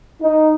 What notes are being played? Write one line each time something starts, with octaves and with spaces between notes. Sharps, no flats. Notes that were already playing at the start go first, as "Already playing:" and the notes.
D#4